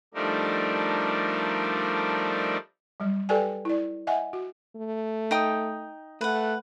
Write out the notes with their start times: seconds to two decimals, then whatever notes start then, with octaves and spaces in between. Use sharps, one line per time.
0.14 F3 G3 A3 D4 D#4 A#4
3.00 F#3 G3
3.29 G4 A4 B4 D5 G5 G#5
3.65 E4 D5
4.07 D#5 E5 F#5 G#5
4.33 F#4
4.76 A3
5.31 D#4 G5 D#6
6.21 A3 B4 F#5